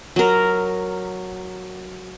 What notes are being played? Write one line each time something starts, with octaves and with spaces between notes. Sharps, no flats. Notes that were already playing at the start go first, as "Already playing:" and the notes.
F#3 A#4